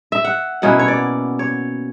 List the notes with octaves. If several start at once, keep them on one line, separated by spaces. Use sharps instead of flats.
E5
F#5
B2 A#3 C#4 E4 F#5
C#5
D5
C#5